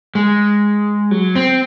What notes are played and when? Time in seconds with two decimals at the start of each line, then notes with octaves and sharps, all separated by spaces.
0.15 G#3
1.11 F#3
1.36 C4